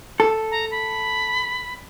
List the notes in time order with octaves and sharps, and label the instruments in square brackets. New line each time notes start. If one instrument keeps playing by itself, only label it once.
[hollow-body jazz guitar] A4
[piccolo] A#5
B5